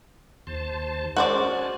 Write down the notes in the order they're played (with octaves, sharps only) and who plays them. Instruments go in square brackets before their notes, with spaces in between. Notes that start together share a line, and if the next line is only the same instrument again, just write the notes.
[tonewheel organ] D#2 C5 A5
[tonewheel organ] G#3 C#4 A#4 [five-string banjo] F#4 C5 D5
[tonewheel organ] G#5 A5